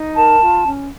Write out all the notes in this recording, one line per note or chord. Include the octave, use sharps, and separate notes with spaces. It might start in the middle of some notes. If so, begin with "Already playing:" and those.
Already playing: D#4
A#4 A5
F4
C#4